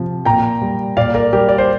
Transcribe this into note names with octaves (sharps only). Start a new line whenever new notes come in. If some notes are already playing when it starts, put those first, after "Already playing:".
Already playing: C3 F3
A#2 G5 A#5
G3
A#2 D5 F5
A#4 D5
G3 G4 A#4
D5
C5